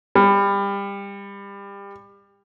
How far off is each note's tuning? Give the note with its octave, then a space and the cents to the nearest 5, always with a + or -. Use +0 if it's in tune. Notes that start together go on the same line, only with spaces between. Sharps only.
G3 +25